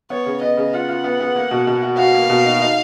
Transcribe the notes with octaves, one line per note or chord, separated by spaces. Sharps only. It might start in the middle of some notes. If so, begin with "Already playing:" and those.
B3 C#5
C#3
B3 D#5
C#3
F4 F#5
F4
B3
B3
A#3
B2
B2
F#4
F#4 F5
A#3
B2
D#4
D#4